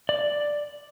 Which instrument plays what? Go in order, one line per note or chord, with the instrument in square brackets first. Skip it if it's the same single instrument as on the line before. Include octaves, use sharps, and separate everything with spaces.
[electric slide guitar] D5